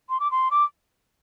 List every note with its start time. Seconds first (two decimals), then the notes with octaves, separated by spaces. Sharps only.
0.09 C6
0.20 D6
0.31 C6
0.50 D6